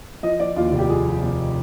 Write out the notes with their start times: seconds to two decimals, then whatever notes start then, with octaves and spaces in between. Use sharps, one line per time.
0.23 F3 D#5
0.40 F3 D5
0.56 D#2 F4
0.67 F4
0.72 F1
0.79 G4
0.89 F3 G#4
1.05 F3
1.23 F1